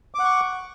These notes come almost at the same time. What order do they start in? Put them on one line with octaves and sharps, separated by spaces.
D6 F#5 C#6